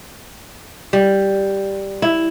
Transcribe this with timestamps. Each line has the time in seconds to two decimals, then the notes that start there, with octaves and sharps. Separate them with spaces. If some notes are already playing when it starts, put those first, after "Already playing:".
0.93 G3
2.02 E4